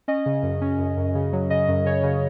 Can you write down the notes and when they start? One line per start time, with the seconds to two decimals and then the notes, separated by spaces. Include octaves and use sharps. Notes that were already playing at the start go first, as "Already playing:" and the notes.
0.08 C#4 D#5
0.26 C#3
0.43 F#2
0.62 C#4
0.79 F#2
0.97 F#2
1.15 C#3
1.33 F#3
1.50 C#3 D#5
1.68 F#2
1.85 C#3 C#5
2.03 C#3